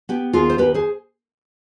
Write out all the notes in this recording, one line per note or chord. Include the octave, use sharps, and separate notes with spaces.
B3 G4
D#2 F4 G#4
C5
D#2 G4 B4
G#4 C5